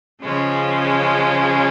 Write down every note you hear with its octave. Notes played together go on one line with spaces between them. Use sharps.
C#3 F3 G#3 C#4